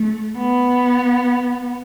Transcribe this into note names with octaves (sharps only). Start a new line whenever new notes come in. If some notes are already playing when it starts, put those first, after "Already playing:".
Already playing: A3
B3